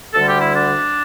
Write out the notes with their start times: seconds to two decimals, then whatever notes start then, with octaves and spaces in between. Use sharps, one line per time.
0.14 D2 D3 G3 A4
0.27 G4
0.40 E4
0.53 D4